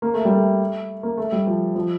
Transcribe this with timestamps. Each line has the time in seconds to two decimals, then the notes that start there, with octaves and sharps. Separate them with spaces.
0.02 A#3
0.14 A3
0.25 G3
0.36 A3
1.03 A#3
1.17 A3
1.32 G3
1.47 F3
1.75 F3